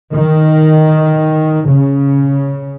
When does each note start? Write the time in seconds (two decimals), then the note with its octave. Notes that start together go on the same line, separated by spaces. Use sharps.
0.13 D#3
1.66 C#3